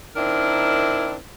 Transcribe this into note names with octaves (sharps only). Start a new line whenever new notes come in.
D#3 C4 D4 E4 A#4